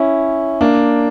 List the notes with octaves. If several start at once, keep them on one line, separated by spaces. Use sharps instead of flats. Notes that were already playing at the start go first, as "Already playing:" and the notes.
Already playing: C#4 E4
A#3 D4